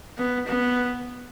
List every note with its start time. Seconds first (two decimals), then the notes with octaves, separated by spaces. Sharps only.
0.18 B3
0.47 B3